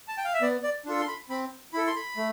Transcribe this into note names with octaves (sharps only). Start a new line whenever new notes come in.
A5
G5
F5
E5
B3 D5
D5
D4 F4 A4
C6
B5
C4 B5
E4 A4 B5
C6
B5
A3